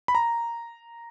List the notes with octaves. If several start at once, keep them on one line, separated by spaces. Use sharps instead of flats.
B5
A#5